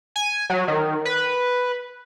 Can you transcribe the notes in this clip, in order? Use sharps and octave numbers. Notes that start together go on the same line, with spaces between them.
G#5
F#3
D#3
B4